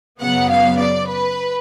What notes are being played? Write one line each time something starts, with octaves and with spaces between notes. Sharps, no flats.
F#2 C#3 F#3 B3 F#5
F5
D5
B4